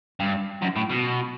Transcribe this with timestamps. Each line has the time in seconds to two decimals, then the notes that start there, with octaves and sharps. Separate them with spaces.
0.20 G2
0.62 F#2
0.76 A2
0.89 B2